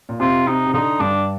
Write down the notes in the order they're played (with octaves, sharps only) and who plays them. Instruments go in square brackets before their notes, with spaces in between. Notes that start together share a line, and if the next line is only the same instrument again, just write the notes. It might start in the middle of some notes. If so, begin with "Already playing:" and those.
[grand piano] A#2
[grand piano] C3 [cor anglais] F4
[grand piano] C3 [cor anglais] D#4
[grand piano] C3
[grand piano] D3 [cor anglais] D#4
[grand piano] G2 [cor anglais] D4